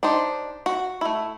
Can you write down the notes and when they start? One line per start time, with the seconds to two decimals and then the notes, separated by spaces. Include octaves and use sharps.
0.03 D4 D#4 G4 C5
0.66 F#4
1.01 A3 E4